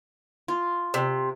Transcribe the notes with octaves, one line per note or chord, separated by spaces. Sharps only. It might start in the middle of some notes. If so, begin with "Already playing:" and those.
F4
C3